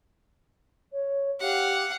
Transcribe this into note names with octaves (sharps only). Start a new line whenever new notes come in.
C#5
G4 F5 F#5